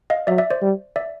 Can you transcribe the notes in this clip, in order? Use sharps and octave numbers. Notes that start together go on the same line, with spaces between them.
D#5 F5
F#3 D5 E5
D5 E5
C5 D5
G3
D5 E5